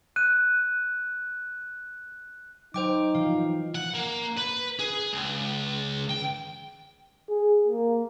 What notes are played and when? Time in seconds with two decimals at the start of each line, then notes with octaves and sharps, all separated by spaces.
0.16 F#6 D#7
2.74 F#3 D#4 C5 G5 D6
3.15 E3 F3 F5
3.75 F#5
3.94 A#3
4.37 B4
4.79 G#4
5.13 C#2
6.11 G5
7.29 G#4
7.68 A#3